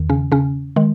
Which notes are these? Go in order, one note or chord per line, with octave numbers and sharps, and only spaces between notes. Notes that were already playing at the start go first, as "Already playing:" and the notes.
Already playing: E2 D#3
C#3 C#4
C#3 C#4
D#3 G#3